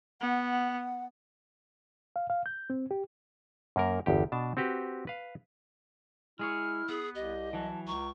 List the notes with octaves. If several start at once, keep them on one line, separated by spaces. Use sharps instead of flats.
B3 F#5
F5
F5
G6
C4
G4
F#2 A#3 A#4
G1 E2 G4
B2 D4 A5
C4 F#4 G4 B4
B4 F5
G#3 E4 G#4 C#5 F6
B3 G#4
C2 G4 D#5
E3 F#3 A5
C#2 A#5 C#6